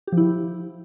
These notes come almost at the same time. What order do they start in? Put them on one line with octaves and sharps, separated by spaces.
G4 F3 E4